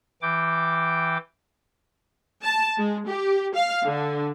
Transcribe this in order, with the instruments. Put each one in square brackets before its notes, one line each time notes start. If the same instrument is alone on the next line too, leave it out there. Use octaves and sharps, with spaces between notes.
[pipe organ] E3 G5 D6
[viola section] A5
G#3
G4
F5
D3